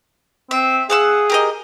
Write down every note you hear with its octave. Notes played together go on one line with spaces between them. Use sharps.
C4 E5
G#4 F5 F#5 E6
G4 A#4 D#5